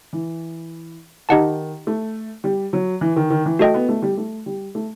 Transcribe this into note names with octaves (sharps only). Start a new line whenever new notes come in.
E3
D#3 D#4 G4 D#5 F#5 A5
A3
G3
F#3
E3
D#3
D#3
E3
A3 F#4 A4 D#5 G5
B3
A3
G3
A3
G3
A3